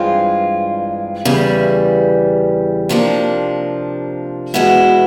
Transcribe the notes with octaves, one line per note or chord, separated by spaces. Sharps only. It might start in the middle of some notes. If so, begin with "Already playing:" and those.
Already playing: G2 E3 G#3 C4 F4
E2 C#3 E3 G3
C3 F3 A#3 D4
E2 B2 G#3 B3 E4